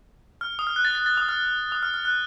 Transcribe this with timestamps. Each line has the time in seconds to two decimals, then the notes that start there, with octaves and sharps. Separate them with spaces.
0.41 F6
0.59 D#6
0.67 F6
0.76 F#6
0.85 A6
0.95 A6
1.06 A6
1.17 D#6
1.29 F6
1.72 D#6
1.83 F6
1.94 F6
2.05 F#6